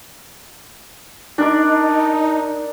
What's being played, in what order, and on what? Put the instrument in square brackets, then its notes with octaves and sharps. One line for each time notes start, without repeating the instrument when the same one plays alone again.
[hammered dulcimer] D4 A#4 D5 [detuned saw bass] D#4